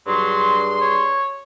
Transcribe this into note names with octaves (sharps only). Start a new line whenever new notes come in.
G2 F#3 G#4 C6
C#5